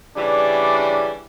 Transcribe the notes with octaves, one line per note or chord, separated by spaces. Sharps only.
C#3 E3 G3 D4